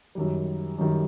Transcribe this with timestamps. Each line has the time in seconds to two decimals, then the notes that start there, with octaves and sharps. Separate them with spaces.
0.15 F#2 D#3 G3
0.78 F#2 D#3 G3